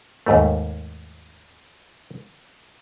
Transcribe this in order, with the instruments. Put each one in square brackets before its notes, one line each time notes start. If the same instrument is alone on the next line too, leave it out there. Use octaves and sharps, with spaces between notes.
[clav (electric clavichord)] D#2 G#2 A3